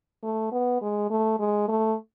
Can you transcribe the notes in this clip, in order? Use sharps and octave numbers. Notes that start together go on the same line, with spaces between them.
A3
B3
G#3
A3
G#3
A3